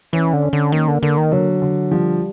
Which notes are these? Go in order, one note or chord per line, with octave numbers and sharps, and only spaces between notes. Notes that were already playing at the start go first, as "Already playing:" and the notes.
E3 C#4
D3
C#4
D3
D#3 A#3
D3
D3 A#3
D#3
D3 F#3
D3
F3 G3